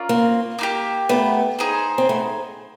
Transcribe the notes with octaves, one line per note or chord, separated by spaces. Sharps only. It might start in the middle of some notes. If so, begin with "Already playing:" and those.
Already playing: C#4 F4 A#4 D5
A#3 C4
A#3 D#4 G4
A3 B3
D#4 G#4 C5
C4
A3 B3